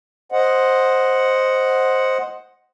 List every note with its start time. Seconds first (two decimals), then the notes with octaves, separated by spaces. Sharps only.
0.32 C5 D#5 F#5